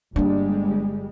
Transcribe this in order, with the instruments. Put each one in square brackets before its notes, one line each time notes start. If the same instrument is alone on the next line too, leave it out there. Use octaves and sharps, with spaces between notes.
[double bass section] G1 G3 G#3 [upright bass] A#3 D4